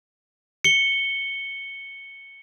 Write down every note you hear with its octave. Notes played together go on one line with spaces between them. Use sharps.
C#7 G7